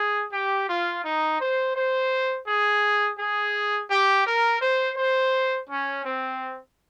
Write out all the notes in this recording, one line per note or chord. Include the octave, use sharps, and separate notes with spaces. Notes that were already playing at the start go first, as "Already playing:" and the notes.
Already playing: G#4
G4
F4
D#4
C5
C5
G#4
G#4
G4
A#4
C5
C5
C#4
C4